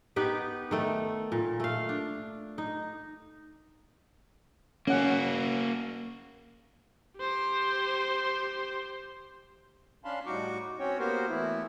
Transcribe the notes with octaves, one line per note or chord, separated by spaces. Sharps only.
B3 D#4 G4 B4
D#3 A3 A4
A#2
A3 F5
D4
D#4
A#3 C#4 F#4 F#5
G4 C5
C#4 D4 F5 A5 B5 C6
A2 G3 D#4 F#4 C#6 D6
C4 C#4 F#4 C#5 G5
A#3 B3 F#4 G4 A#4 C5
E3 A3 B3 E4